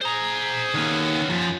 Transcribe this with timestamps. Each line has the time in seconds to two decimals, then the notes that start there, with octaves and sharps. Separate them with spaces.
0.02 G#4 C5 A#5
0.74 D#3 A#3 B3 C#4
1.30 F#2 F3